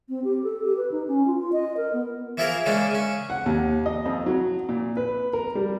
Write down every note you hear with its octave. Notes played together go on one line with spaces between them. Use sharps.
C4
G4
A4
G4
B4
D#4
C#4
F4
F4
D#5
A#4
B3
E3 F3 E4 F4 G#4 A#4
C#3 E3 G#3 A#3 C#4 D4
C#3 C#4
F#5
D#2
D#5
F2
F#3
A#2
B4
A#4
G3